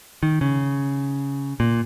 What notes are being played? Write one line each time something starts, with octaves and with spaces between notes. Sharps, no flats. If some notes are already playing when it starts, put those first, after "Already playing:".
D#3
C#3
A#2